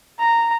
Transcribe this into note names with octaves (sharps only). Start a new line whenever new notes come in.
A#5